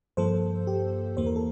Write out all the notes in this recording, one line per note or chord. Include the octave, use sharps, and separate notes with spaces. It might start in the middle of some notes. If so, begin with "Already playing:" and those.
G2 F3 A#3 A4 C5
G4
E2 E3 A#3 C5
A#4
A4